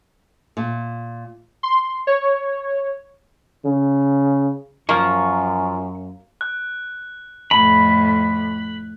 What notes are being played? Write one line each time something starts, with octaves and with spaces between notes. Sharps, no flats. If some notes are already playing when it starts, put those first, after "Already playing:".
A#2
C6
C#5
C#3
F#2 F3 A#3 C#6
F#6
F2 A2 B5